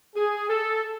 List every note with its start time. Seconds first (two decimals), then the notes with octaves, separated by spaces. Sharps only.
0.15 G#4
0.49 A4